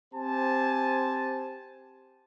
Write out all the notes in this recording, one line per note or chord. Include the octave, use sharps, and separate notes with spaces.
C4 G4 C5 G#5 A5